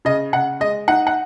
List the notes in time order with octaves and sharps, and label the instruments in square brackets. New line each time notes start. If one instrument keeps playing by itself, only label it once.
[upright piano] C#3 D#5
C#3 F#5
G#3 D#5
D#4 F#5
F#5